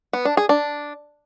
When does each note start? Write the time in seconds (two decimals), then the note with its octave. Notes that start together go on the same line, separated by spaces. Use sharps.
0.13 B3
0.25 D4
0.37 G#4
0.49 D4